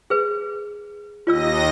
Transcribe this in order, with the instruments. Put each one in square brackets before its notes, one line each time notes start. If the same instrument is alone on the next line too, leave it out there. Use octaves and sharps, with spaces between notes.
[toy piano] G#4 B4
[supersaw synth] D#2 D#5 A#6 [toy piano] F4 D5 E6